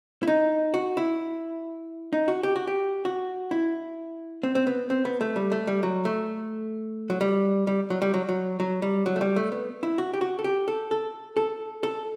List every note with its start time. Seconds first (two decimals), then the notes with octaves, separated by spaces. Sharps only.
0.23 E4
0.27 D#4
0.74 F#4
0.97 E4
2.13 D#4
2.28 F#4
2.43 G4
2.56 F#4
2.67 G4
3.05 F#4
3.51 E4
4.43 C4
4.55 C4
4.67 B3
4.90 C4
5.05 B3
5.21 A3
5.36 G3
5.52 A3
5.67 G3
5.83 F#3
6.05 A3
7.10 F#3
7.21 G3
7.67 G3
7.90 F#3
8.02 G3
8.14 F#3
8.29 F#3
8.60 F#3
8.82 G3
9.06 F#3
9.16 A3
9.21 G3
9.36 A3
9.52 B3
9.83 E4
9.98 F#4
10.14 G4
10.21 F#4
10.39 A4
10.44 G4
10.68 A4
10.91 A4
11.37 A4
11.83 A4